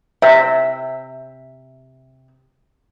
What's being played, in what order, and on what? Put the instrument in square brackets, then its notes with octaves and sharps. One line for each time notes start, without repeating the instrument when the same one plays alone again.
[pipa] C3 [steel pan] E5